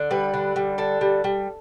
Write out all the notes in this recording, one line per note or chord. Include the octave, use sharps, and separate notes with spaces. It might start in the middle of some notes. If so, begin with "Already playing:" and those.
Already playing: D3
G3 B4
D3
G3
D3 A4
G3
G3